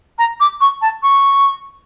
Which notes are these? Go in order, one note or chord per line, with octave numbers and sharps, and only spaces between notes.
A#5
D6
C#6
A5
C#6